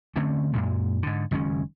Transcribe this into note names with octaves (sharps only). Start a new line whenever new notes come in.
D3 A3 C4 C#4
F#2 A#2 G#3
G#2 D3
F#1 D#3 G#3 C#4